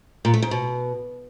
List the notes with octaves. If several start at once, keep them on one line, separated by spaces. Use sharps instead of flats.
A#2
A3
G#2
B2